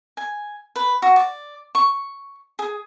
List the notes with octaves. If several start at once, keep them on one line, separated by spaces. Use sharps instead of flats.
G#5
B4
F#4
D5
C#6
G#4